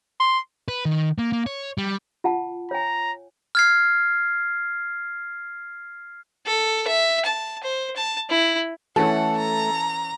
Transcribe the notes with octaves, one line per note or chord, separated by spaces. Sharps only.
C6
B4
D#3
A#3
A#3
C#5
G3
F4 F#5 A5
C#5 G#5 A#5
F6 G#6 C7
A4
E5
A5
C5
A5
E4
E3 A3 C#4 A4 F#5
A#5